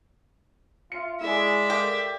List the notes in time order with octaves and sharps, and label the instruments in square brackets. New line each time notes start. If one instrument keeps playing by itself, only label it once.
[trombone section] F4 [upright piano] E5 C#7
[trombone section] G#3 [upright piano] E4 G#4 [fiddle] D5 E5
[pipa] G4 [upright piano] A4 A#4 F5